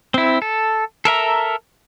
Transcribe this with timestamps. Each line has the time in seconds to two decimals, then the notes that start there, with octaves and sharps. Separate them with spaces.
0.14 C4 E4
0.42 A4
1.05 A4 A#4 E5 A#5